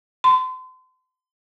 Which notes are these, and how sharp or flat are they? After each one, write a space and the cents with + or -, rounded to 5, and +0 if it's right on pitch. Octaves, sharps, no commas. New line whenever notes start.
C6 -35